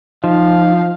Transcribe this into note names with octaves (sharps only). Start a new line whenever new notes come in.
F3 D#4 F5